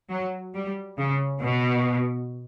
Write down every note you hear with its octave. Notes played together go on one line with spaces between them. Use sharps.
F#3
G3
C#3
B2